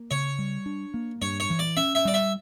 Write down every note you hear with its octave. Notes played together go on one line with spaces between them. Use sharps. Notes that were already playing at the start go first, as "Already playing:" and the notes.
Already playing: A#3
C#3 C#5
G3
D4
A#3
G2 C#5
C#5
E3
D5
C#4 E5
E5
G3 D5
E5